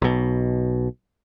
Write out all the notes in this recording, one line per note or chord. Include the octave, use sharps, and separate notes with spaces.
B1 B2